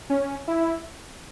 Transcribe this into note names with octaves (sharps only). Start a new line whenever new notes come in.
C#4
E4